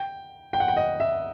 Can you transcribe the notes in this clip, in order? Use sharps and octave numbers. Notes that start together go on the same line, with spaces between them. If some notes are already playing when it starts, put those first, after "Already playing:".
Already playing: G5
G5
F#5
G5
D#5
E5